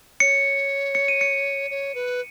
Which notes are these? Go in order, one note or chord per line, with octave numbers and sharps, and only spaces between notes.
C#5 C#7
C#7
D#7
C#7
C#5
B4